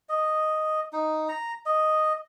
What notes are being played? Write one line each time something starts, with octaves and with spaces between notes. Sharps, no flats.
D#5
D#4
A#5
D#5